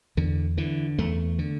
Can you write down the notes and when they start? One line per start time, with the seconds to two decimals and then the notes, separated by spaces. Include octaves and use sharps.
0.17 E2 D3
0.57 D3 E3
0.98 E2 A3
1.39 D3